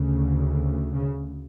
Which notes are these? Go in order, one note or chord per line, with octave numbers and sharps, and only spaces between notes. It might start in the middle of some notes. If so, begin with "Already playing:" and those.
Already playing: D2 C#3
C#3